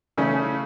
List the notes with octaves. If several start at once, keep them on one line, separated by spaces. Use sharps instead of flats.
C#3 E3 A3 C#4